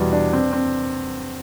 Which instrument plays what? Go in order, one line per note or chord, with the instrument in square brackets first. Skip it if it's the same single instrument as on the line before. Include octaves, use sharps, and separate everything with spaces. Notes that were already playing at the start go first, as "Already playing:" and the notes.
Already playing: [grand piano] E2 B2 G3
D4
C4
C4